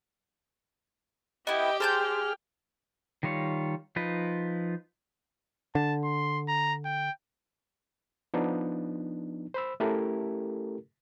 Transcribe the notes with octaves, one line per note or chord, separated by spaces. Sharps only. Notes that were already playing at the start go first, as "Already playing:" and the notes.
B3 E4 G4 D#5 G5
G#4 C5 A5 F6 G6
D#3 G3 F4 C#5
F3 D#4 F4 B4
D3 A5
C6
A#5
G5
F3 B3 D4 D#4
C5 B5 E6
A3 C#4 E4 G4 A4 A#4